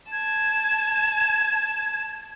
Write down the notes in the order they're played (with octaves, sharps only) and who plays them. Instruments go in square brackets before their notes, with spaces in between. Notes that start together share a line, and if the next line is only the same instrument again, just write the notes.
[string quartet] A5 [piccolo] G#6